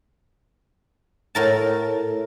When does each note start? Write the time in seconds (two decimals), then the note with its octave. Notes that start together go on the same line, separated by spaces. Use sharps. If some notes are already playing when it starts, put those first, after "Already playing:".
1.35 A2 A#4 A5